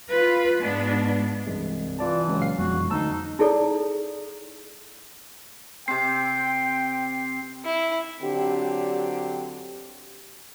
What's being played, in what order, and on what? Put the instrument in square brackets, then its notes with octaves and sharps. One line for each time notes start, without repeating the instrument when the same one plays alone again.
[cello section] F4 B4
G#2 G#3 B3 D4
[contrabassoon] C2 [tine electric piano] G2 E3 G#3
[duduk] E3 [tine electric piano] F4 D5 A5
[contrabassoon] C#2 [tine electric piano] F#3
[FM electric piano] A#2 F5 C7
[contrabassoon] E1 [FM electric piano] F2 [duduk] F#4
[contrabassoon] D2 [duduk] D#4 [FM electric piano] A5 E6
[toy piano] D#4 E4 G#4 A4 C#5 D5
[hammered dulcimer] C3 C4 [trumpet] G5 [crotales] C7
[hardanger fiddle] E4
[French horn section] D3 F#3 C4 G4